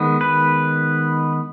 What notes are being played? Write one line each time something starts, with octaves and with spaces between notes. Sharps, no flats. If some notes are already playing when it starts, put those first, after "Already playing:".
Already playing: D#3 G#3 B3
B4